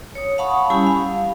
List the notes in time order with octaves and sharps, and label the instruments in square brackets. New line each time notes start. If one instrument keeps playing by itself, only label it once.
[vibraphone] C#5 D#6
F5 F#5 A5 B5 C#6 D#6
G3 C#4 E4 G4 G#5 B5
F5